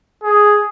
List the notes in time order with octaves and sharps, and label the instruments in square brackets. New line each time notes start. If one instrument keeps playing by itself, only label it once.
[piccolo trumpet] G#4